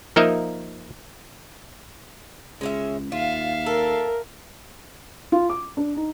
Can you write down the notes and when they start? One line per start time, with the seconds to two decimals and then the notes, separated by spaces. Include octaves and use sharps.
0.16 F3 A#3 D#4 A#4 D#5 E5
2.61 C#2 G#3 C#4 E5
3.12 D#2 F4 E5 F5
3.66 A4 A#4
5.32 F4
5.50 D6
5.77 D4
5.96 D#4